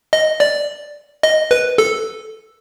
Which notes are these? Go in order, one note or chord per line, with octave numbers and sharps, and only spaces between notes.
D#5
D5
D#5
B4
A4